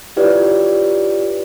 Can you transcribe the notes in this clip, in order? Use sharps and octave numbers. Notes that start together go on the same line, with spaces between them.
E4 F4 G4 B4 C#5 D5